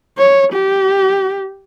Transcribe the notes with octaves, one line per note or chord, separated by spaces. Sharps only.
C#5
G4